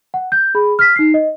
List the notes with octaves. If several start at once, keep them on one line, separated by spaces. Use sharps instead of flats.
F#5
G6
G#4 B5
F6 B6
D#4 C7
D#5